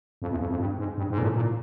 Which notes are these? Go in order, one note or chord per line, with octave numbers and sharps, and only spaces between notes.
F2
E2
F2
F2
G2
G#2
G2
G#2
A#2
A2
A#2